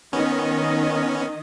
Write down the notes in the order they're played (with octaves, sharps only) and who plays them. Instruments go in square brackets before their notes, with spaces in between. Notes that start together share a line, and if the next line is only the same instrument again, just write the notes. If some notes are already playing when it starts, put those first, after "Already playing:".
[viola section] D#3 D#5 [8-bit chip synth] B3 C#4